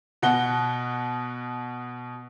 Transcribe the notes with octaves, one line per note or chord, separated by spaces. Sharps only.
B2 F#5 G7